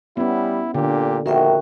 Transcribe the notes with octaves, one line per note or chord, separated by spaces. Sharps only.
G3 B3 C#4 E4
A#2 D3 G4
A#1 D#3 F#4 A#4 E5 G5